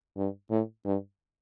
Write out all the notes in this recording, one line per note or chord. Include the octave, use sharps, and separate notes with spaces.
G2
A2
G2